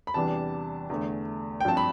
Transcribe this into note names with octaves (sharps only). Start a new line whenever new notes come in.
B5
E2 C3 E3 G3 D4 A5
E2 D3 A3
G5
G2 F3 C4 A5
B5